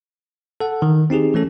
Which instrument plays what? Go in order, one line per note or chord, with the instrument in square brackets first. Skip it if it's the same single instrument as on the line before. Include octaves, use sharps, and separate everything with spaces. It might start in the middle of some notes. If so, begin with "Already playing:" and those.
[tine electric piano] A4 F#5
D#3
C4 D#4 G4 G#4
E3 A3 C#4 A4